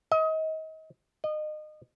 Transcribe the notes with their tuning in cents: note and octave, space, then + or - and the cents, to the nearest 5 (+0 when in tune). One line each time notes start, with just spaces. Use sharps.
D#5 +30
D#5 -30